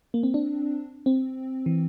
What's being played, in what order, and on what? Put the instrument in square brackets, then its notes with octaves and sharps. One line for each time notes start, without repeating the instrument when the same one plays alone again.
[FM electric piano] A#3
C4
D4
C4
E3